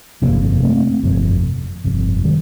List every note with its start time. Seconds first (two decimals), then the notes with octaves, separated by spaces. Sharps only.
0.22 G1 F2 C3 A#3 D4
0.63 A3 C4
1.03 G1 F2 C3
1.84 G1 F2 C3
2.24 D#3 G3